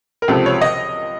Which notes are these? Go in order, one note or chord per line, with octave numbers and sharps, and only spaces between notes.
A#4
C#2 C3 F3 A4
C#5
D#5